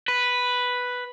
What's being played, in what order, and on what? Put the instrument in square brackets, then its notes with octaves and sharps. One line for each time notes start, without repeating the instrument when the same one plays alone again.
[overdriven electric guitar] B4